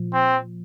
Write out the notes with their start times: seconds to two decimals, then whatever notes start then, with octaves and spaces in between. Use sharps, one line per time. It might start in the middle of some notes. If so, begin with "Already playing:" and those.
Already playing: A#2 F3
0.13 C4